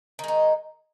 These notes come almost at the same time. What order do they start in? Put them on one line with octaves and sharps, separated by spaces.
D#3 G#3 D#4